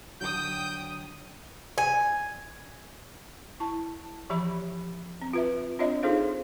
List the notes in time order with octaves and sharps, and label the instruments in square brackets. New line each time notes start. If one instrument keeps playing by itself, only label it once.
[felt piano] D3 F#3 [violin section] G5 D#6 [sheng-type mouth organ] G6
[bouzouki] G#5
[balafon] E4 A5
E3 F3 G4 E5 B5
C4
F4 B4 E5
C4 D4 F4 C#5 D#5 E5
D#4 F4 G#4 A4 C5 F5